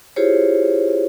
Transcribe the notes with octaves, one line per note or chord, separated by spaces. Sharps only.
E4 F4 G4 G#4 C5 C#5